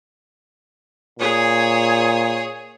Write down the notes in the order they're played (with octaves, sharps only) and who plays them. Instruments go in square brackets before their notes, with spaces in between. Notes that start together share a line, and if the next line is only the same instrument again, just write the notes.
[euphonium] A#2 [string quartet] G#4 C#5 D#6